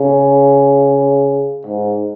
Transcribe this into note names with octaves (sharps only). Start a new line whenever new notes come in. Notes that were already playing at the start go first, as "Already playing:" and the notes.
Already playing: C#3
G#2